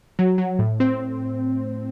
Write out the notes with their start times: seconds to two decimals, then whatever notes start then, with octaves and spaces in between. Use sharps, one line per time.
0.19 F#3
0.38 F#3
0.59 A2
0.80 C4